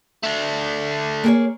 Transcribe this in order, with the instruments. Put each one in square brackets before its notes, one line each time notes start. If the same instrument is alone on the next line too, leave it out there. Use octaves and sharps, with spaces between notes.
[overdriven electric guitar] A3 D4
[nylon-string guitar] A#3 G#4 C#5